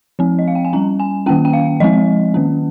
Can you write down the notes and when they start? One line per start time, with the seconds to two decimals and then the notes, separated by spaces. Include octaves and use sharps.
0.19 F3 C4
0.39 D#5
0.48 F5
0.55 G5
0.65 G#5
0.73 G3 C#4 A#5
1.00 G#5
1.26 D#3 A#3 C#4 G5
1.45 G5
1.53 F5
1.80 F3 G#3 C4 D#5
2.34 D#3 A#3 C#4